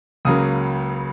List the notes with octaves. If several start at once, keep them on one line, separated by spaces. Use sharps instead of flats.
C#2 C#3 F#3 A#3 D#6